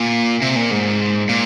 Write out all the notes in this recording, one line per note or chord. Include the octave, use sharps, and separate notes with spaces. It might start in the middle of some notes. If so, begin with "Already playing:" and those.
Already playing: A#2
C3
A#2
G#2
A#2